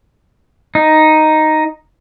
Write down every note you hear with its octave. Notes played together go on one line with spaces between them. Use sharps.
D#4